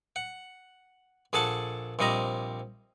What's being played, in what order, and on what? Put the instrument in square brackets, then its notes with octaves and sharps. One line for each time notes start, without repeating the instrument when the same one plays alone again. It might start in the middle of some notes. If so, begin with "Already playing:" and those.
[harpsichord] F#5
A#1 G#4 A4 F#5 A5
A#1 C3 G3 D#5 A#5